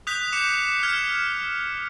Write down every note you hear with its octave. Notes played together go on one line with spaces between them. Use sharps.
D#6 F#6 G6 B6 F7
D6 C#7 E7
F6 G#6